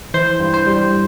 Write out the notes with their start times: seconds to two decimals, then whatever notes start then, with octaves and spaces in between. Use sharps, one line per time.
0.14 E3 C5
0.40 G2
0.54 C5
0.67 G3